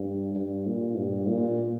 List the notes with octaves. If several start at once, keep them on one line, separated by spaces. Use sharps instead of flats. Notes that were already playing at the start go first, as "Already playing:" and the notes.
Already playing: G2
G2
A#2
G2
A#2